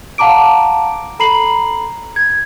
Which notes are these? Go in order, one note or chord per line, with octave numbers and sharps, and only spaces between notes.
F5 F#5 A5 A#5 D6 D7
A4 A#5 B5 C7 F#7
G#6